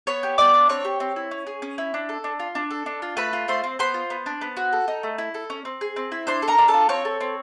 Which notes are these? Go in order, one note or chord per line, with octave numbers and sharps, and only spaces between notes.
B3 C#5 C#6
G4
B3 D5 D6
D4
C4 C#5 C#6
G4
C4
E4
C#4
G#4
C#4
E4
D4
A4
D4
F4
D4
A4
D4
F4
A3 B4 B5
F4
A3 C5 C6
C4
B3 C5 C6
F4
B3
D4
B3
F#4
A4
D#4
A3
E4
A4
C#4
C4
G#4
C4
E4
D4 C5 C6
A4
A#4 A#5
D4
A4 A5
F4
C4 C#5 C#6
A4
C4